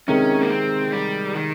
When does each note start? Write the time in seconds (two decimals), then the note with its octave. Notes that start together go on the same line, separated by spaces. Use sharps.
0.07 C3 D#3 G#3 C#4 D#4 A#4
0.42 A#3
0.49 C4
0.92 G3
1.35 D#3